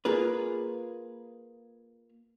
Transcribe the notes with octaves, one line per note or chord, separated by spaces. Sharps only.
A#3 F4 G#4 B4